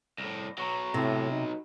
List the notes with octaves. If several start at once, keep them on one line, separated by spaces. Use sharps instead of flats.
C2 A2 A#6
B2 F#3 A#5 C#6 A#6
A2 C3 C6 A#6
D#4